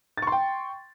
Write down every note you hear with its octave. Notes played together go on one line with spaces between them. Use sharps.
G5 C6 C#6 A6